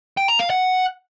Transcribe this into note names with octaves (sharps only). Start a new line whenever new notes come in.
G5
A#5
F5
F#5